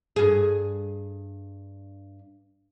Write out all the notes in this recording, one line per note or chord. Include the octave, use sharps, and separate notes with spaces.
G2 G#4